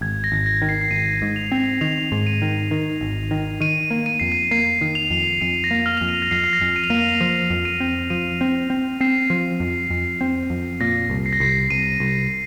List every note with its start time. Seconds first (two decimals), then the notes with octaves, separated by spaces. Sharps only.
0.01 G#1 G#6
0.24 A#6
0.32 G#1
0.46 A#6
0.62 D#3
0.69 C7
0.81 C7
0.91 G#1 D#7
1.22 G#2
1.36 F7
1.52 C4
1.81 D#3 F7
2.12 G#2
2.27 D#7
2.42 D#3
2.71 D#3
3.01 G#1
3.31 D#3
3.60 D#3 D#7
3.91 A#3
4.06 D#7
4.20 F2 C7
4.32 D#7
4.51 A#3 C7
4.81 D#3
4.95 F7
5.11 F2
5.41 F2 D#7
5.64 A#6
5.71 A#3
5.86 F6
5.97 F2 F7
6.09 D#7
6.22 A#6
6.31 F2 C7
6.44 C7
6.53 A#6
6.61 F2
6.76 D#7
6.84 F7
6.90 A#3 D#7
6.99 F7
7.21 F3 D#7
7.50 F2
7.65 D#7
7.80 C4
8.10 F3 D#7
8.41 C4
8.70 C4
9.01 C4 C7
9.30 F3
9.60 F2
9.90 F2
10.21 C4
10.50 F2
10.81 A#2 A#6
11.10 C2
11.26 C7
11.33 A#6
11.40 C2 C7
11.70 C2 D#7
12.00 C2